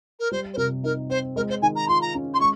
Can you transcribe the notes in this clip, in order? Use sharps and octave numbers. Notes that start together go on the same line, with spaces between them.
A#4
G3 C5
C5
C3 A#4
D#4 A#4
C4 C5
G#3 A#4
C5
D#3 G#5
A#5
F4 C6
A#5
C#4
C6
G#3 C#6